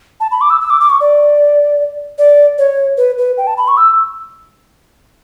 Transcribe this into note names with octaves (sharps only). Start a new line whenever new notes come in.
A5
B5
D6
E6
E6
D6
D6
C#6
D5
D5
C#5
B4
B4
G5
A5
B5
C#6
E6